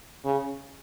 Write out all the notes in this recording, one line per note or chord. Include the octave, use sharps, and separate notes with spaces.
C#3